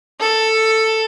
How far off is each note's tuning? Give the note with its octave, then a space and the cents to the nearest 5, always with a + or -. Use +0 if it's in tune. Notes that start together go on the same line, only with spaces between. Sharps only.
A4 +10